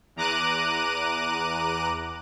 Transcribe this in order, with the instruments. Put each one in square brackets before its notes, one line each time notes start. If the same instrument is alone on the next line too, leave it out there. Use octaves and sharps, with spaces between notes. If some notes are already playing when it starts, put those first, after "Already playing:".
[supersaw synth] E2 A#5 D6 F#6 D#7